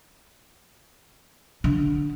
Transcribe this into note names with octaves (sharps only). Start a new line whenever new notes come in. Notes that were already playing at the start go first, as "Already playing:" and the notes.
D3